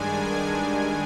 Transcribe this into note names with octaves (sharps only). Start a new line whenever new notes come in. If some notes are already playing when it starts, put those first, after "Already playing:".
Already playing: G2 D#3 G#3 D4 G#5